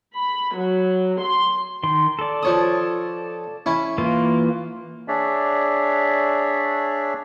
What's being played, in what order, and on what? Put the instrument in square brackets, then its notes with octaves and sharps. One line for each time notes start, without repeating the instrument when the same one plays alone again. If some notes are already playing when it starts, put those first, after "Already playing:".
[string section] B5
F#3
C6
[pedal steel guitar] D#3 C6
A4 D5
[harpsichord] F3 C#5 D#6
C#4 E4
[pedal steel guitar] E3 A#3 F4
[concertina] D4 G#4 C#5 D5 E5